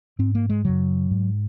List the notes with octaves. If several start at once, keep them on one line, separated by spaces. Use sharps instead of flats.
G#2 C4
A#3
G#3
F#2 C#3 F#3
G#2